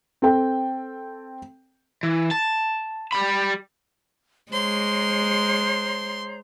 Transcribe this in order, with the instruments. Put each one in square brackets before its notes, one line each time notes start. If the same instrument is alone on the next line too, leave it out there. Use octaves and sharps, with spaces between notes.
[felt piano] C4 A4 G5
[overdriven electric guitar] E3
A5
G3 B5
[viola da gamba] G#3 [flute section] C5 C#5 A#5 [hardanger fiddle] C6